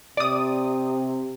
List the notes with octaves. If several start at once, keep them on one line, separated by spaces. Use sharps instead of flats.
C3 D5 D#6